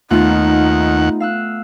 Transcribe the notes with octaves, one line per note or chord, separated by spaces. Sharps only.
D#2 A3 B3 D#4 F4 F#5
F5 E6 F#6